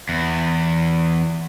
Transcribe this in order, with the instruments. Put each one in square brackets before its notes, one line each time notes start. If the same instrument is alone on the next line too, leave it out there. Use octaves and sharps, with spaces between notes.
[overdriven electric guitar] E2